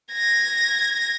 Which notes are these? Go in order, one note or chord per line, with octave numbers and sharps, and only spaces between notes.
G#6 A#6